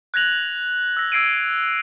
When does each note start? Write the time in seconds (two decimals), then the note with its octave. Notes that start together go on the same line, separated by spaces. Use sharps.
0.14 F#6 G#6 A#6 F7 F#7
0.97 E6 A#6
1.12 E6 G#6 C7 D7 D#7